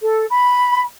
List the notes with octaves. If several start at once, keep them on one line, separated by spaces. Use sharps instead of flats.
A4
B5